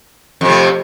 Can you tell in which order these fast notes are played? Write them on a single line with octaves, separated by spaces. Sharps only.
F2 C3 A3